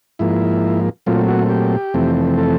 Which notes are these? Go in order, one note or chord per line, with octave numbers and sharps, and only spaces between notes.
G#2 F3 A#3 E4
A#2 F#3 A3 C4 F4
F#4
G4
F2 C3 E3 A3 C4
A4